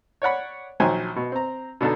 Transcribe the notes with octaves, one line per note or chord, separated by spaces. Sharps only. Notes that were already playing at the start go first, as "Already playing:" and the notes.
C#5 D5 F#5 B5
A#1 D#3 F#3 C5 G5 G#5
B2
C4 A#5
B2 D3 D4 D#4 A4